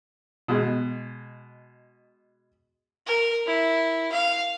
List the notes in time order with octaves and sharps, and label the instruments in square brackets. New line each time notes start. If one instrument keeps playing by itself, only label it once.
[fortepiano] B2 G#3
[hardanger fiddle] A#4
E4
F5